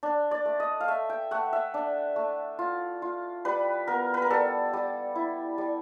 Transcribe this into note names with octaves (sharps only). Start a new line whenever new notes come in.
D4
D5
A3
D#5
F5
A3 E5
G5
A3 F#5
E5
D4
A3
F4
F4
G3 B4
B3 A#4
B4
A#4
G3 A4
G3
E4
G3